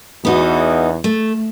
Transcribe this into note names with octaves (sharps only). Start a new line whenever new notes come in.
E2 B3 D#4 F#4
A3